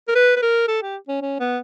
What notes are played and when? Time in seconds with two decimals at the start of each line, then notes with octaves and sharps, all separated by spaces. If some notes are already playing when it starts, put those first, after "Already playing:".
0.08 A#4
0.15 B4
0.36 B4
0.42 A#4
0.68 A4
0.82 G4
1.08 C#4
1.21 C#4
1.40 B3